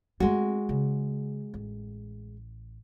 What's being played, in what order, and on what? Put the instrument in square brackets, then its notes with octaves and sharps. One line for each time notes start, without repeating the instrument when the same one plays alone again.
[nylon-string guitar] G#3 F#4 [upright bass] A3 C4
[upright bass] C#3
A1